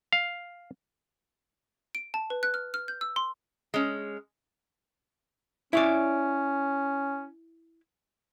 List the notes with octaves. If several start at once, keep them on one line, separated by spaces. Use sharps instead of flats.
F5
D7
A5
B4
F#6
F6
F6
G6
E6
C6
G#3 C#4
C#4 E4 C#5 D5